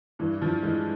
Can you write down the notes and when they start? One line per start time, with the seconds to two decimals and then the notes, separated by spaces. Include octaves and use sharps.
0.19 G2 E3
0.41 G2 F3
0.63 E3 G#3